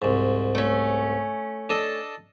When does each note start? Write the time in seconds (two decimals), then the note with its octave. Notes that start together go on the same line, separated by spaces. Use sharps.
0.02 C2 G#2
0.55 A3 C#4
1.69 D4 A4 D#5